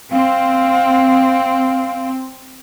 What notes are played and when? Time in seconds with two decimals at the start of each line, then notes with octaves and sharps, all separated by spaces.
0.12 C4 F5